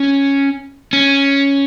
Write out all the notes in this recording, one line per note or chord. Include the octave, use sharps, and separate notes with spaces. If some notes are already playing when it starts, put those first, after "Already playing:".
Already playing: C#4
C#4